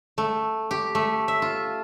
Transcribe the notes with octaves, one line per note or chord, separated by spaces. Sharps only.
A3
G4
A3
E5
F4